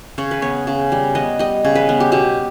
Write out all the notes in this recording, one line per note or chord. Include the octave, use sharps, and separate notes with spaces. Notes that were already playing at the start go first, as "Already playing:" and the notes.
C#3 C#5
B4
B3 C#5
C#3
G3
B3 D#5
G3 D#5
C#3
B4
B3
G4
B2 G4